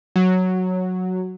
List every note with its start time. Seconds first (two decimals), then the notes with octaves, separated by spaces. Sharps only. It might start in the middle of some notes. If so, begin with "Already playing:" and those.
0.16 F#3